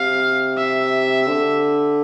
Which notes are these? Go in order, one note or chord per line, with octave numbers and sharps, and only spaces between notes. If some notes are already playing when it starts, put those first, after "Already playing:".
Already playing: C3 F5
E5
D3